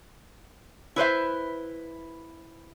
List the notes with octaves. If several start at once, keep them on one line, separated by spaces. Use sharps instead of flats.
E4 B4 C5 E5